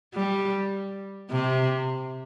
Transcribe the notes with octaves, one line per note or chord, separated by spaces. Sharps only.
G3
C3